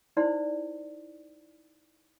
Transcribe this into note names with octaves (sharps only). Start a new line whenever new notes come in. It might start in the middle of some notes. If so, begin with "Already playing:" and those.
D#4 E4 C5 D5 C6